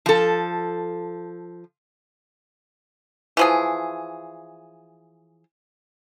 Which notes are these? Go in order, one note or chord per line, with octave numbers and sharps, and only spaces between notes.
F3 A4
E3 F3 G#4